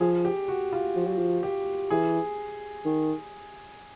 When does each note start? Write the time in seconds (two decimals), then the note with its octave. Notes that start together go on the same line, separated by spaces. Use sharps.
0.01 F3 G#4
0.25 G4
0.48 F#4
0.73 F4
0.96 F3
1.07 F#3
1.18 F3
1.43 G4
1.90 E3 G#4
2.85 D#3